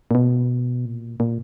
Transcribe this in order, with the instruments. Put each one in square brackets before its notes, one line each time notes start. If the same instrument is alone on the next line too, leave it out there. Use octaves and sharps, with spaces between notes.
[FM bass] A#2
B2
A#2
A#2